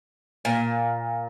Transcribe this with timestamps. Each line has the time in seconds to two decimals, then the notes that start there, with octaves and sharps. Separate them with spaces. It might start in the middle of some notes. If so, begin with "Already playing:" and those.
0.45 A#2